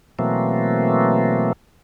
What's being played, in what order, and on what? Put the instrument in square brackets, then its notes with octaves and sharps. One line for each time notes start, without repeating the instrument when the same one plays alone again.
[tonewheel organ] B2 E3 F#3 A3 A#3 C4